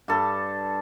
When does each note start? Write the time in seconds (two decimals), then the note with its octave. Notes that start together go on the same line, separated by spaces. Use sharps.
0.08 G2 A4